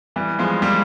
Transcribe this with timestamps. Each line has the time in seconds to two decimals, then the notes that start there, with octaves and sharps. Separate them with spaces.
0.16 E3 G3
0.39 F3 G#3
0.62 G3 A#3